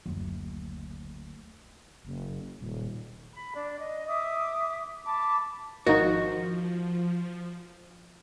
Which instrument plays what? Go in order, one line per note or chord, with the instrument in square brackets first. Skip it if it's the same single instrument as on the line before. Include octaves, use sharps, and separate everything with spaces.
[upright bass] F#1 D2
[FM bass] F#1
D#1
[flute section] B5
D4
D#5
E5 D6 D#6
A5 B5 D6
[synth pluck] G#1 D#4 C#6 [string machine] F3 [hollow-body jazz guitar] F#4 [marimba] A#4 D#5 F5